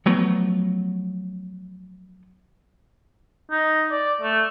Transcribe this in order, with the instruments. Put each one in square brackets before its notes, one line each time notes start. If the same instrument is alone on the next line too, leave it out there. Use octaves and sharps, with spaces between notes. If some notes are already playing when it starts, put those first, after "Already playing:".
[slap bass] F3 F#3 A3 B3
[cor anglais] D#4
D5
A3